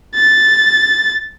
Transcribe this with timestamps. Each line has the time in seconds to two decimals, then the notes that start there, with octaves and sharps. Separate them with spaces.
0.15 A6